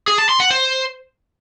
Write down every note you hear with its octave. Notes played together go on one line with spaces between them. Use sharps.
G#4
A5
C6
F#5
C5